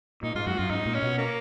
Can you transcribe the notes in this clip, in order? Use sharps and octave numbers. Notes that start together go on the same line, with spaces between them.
A#2 D#4
G#2 F4
F#2 F#4
F#2 F4
G#2 D#4
A#2
C#4
B2
A#3